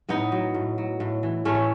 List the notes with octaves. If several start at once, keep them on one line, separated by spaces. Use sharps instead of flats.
A2 B3 D#4
F#3
A2
F#3
A2
E3
A2 A3 C#4